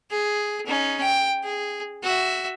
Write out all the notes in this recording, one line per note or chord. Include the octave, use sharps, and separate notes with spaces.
G#4
C#4 D#4
G5
G#4
F#4 E5